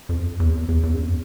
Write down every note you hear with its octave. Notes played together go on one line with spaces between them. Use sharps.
F2
E2
E2
E2
F#2
F2